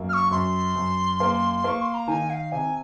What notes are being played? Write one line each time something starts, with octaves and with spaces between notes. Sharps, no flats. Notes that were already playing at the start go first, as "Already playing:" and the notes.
Already playing: F#2 A#3
F6
C#6
F#2 C6
F#2
A#3
A#3 C#6
C6
A#5
D#3 G#5
F5
C3 G#5